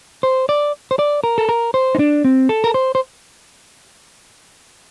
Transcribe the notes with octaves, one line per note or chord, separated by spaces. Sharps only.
C5
D5
C5
D5
A#4
A4
A#4
C5
D#4
D4
C4
A4
A#4
C5
C5